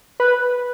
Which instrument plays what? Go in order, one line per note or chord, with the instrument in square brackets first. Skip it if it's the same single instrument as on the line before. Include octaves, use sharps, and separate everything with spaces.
[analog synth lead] B4